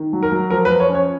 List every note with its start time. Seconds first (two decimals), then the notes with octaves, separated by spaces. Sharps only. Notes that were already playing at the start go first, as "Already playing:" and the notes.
Already playing: D#3
0.13 F#3
0.23 A#4
0.32 F#3
0.50 F3 A#4
0.65 B4
0.70 F3
0.80 C#5
0.89 C#4
0.95 C#5